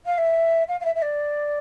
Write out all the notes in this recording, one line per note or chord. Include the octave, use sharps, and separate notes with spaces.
F5
E5
F5
F5
E5
E5
D5